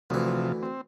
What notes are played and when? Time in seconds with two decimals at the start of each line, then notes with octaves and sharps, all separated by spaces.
0.10 D2 C3 E3 F3
0.63 C4